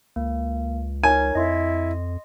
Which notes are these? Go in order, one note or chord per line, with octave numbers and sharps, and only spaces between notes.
C#2 A#3
D#4 A#4 C#5 G#5
F2 E4 D#5 C6